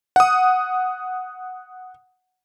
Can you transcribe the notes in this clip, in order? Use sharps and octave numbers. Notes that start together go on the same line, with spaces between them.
F#5 D#6